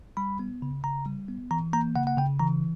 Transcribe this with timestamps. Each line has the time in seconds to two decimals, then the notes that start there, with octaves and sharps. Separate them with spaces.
0.17 G3 B5
0.39 B3
0.62 C#3
0.84 C#3 A#5
1.06 G3
1.28 B3
1.51 E3 A#5
1.73 A#3 A#5
1.96 C#3 F#5
2.07 F#5
2.17 C#3 G5
2.40 E3 A#5